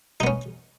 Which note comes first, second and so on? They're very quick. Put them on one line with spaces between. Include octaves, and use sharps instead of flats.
D#4 B3 C#4